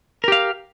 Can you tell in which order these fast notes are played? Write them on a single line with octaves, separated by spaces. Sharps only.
A#4 G4 F5